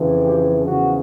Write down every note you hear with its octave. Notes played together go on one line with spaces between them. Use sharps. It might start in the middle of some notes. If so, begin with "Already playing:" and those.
Already playing: F2 C#3 E3
G4
E2 C#3 F3 F#4